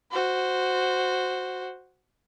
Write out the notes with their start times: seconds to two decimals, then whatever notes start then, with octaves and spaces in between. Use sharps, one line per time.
0.11 F#4 C5